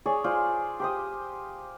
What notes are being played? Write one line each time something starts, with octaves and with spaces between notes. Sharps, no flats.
G#4 C#5 D5
F4 C5 D5
G4 C5 D#6